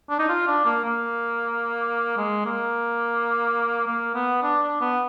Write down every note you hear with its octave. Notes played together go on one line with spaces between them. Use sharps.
D4
D#4
F4
D4
A#3
A#3
G#3
A#3
A#3
B3
D4
D4
B3